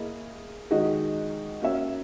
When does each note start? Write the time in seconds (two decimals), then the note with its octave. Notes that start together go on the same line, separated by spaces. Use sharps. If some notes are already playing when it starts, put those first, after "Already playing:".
Already playing: A#3 E4 G#4 D#5
0.71 D#3 G#3 D#4 F#4
1.61 A#3 C#4 F#4 C#5 E5